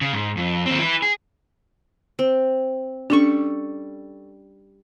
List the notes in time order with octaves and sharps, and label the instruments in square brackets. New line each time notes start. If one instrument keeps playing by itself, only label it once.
[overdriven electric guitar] C#3
G#2
F2
D#2 C4
E4 B4
G#4
[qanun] C4
[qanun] G3 A4 C#6 [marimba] C#4 D4